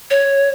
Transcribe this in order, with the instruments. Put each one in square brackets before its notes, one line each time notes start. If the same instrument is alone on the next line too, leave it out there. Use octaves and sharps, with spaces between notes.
[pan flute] C#5